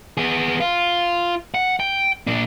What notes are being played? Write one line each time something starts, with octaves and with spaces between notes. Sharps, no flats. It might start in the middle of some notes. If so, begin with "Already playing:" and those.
B3 G#4
F4
F#5
G5
A#2 D4